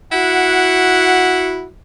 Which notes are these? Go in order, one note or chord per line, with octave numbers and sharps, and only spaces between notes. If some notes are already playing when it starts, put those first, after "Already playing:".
E4 F#4 F#5